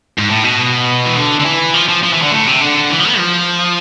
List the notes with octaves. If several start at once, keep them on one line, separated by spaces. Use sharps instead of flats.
G#2
A2
B2
E3
D3
D3
E3
F3
F3
F3
E3
D3
A2
C3
D3
E3
F3
B3
F3